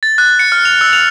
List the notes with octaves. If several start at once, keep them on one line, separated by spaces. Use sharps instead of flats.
A6
F#6
C#7
F6
F7
E6
F7